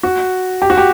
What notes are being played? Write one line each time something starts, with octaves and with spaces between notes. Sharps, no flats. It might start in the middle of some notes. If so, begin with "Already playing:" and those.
F#4
G4
F#4
G4